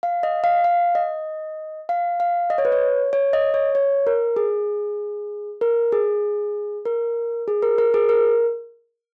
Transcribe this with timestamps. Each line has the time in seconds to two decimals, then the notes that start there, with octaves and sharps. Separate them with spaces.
0.03 F5
0.23 D#5
0.44 F5
0.64 F5
0.95 D#5
1.89 F5
2.20 F5
2.50 D#5
2.58 C#5
2.65 B4
2.72 C#5
3.13 C#5
3.33 D#5
3.54 C#5
3.75 C#5
4.07 A#4
4.36 G#4
5.61 A#4
5.92 G#4
6.85 A#4
7.48 G#4
7.62 A#4
7.78 A#4
7.94 G#4
8.09 A#4